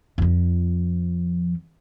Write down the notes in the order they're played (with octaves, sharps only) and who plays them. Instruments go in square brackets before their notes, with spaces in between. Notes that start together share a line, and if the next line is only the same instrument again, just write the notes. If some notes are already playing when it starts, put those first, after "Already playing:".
[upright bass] F2 F3